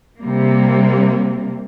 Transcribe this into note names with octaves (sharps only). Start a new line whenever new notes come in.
C3 G3 A#3